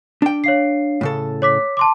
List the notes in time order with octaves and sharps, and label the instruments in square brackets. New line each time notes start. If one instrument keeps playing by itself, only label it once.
[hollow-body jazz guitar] D4 G5
[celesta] C#5 F5 C7
[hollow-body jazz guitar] A2 C#3 A4
[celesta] C#5 D6 B6
A5 C6 D6